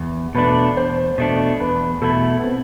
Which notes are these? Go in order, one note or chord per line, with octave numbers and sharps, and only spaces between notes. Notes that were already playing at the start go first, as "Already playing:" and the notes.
Already playing: E2
B2 A3 D4 B4
E2 C5
B2 A3 D4
E2 B4
B2 A3 E4 A4
B3
C4